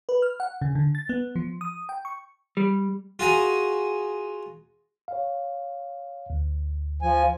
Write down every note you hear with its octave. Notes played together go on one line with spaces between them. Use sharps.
B4
F6
F#5
C#3
D3
A6
B3
F3
D#6
G5
C#6
G3
F4 F#4 G#4 A#5
C#5 F5
D2
F3 G#5